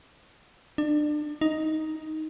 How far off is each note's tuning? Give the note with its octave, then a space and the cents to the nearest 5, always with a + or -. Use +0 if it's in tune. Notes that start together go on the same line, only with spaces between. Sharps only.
D4 +30
D#4 +5